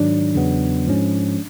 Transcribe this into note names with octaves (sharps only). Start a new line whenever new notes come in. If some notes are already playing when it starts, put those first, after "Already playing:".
Already playing: G#2 D#3 F#3 D4
E2 C#3 F#3 B3
G#2 F3 G#3 C#4